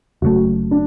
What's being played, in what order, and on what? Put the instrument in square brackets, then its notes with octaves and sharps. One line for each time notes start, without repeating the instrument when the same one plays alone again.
[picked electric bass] F#1 F#2 F#3 A3 [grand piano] F#4
[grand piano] D4